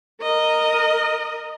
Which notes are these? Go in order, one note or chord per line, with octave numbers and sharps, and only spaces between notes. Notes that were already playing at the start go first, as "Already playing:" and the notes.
A#4 D#5